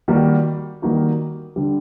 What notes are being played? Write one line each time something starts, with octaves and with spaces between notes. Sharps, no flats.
D#3 G3 A#3 D#4 F#4
D#3 G3 A#3 D#4 F#4
D3 G3